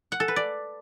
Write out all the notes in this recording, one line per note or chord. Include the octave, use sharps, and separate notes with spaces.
F#5
A4
B4
D5